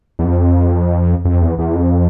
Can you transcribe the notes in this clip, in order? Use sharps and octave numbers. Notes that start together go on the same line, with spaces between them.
E2
F2
F2
E2
E2
F2